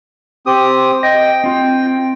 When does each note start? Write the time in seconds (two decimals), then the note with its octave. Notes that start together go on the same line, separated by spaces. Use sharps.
0.46 C4 G4 D#6
1.03 D#5 G5
1.44 C4 F4